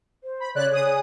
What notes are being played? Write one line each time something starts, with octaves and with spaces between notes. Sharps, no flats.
C5
B5
C#3 C#5 D5 F#6
G#4 D#6